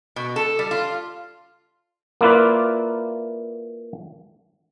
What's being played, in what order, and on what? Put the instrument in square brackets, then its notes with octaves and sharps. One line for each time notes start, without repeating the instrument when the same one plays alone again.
[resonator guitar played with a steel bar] B2
A4
G3
F4
[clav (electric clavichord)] A#3 E4 F4 B4 D5